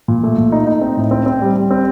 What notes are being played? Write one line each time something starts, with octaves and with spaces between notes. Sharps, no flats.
A#2
A3
A#2
D#4
D#4
C4
A2
C4
C4
G3
G3
C4